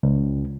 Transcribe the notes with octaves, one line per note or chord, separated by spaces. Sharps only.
C#2